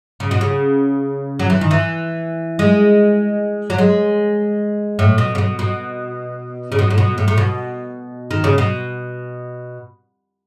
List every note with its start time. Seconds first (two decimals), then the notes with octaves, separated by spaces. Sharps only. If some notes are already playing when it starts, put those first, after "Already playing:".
0.20 C#3
0.31 B2
0.41 C#3
1.39 F#3
1.50 E3
1.61 D#3
1.71 E3
2.59 G#3
3.70 F#3
3.78 G#3
4.99 A2
5.18 B2
5.35 C#3
5.38 B2
5.59 B2
6.72 C#3
6.79 B2
6.90 A2
6.98 B2
7.18 A2
7.28 A2
7.38 B2
8.31 D#3
8.44 C#3
8.58 B2